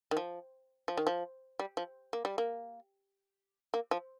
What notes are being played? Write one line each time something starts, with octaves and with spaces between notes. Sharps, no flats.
D#3
F3
F3
D#3
F3
G3
F3
A#3
G3
A#3
A#3
F3